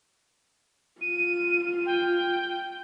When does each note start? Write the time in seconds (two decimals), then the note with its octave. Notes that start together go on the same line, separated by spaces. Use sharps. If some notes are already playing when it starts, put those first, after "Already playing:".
1.01 F4 D#7
1.86 G5